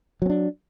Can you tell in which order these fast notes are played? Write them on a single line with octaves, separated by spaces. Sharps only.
F#3 C4 D4